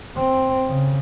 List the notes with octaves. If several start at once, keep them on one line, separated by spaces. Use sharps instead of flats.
C4
C#3